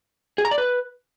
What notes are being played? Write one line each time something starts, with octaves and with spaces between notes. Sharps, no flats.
G#4
A#5
D5
B4